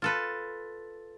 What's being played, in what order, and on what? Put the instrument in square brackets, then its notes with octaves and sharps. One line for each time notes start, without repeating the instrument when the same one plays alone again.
[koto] F4 A4 B4